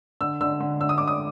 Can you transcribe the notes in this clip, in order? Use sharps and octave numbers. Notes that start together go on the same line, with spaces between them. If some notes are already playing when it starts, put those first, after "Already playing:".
D3 E6
D3 E6
D3
D3 E6
D#6
D3 D6
D#6